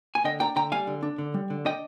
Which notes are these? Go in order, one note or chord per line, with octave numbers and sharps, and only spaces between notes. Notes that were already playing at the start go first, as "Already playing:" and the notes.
G#5
D3 D#5 G5
D4 G5 A#5
D3 G5 A#5
G3 F5 G#5
D3
D4
D3
G3
D3
D4 D#5 G5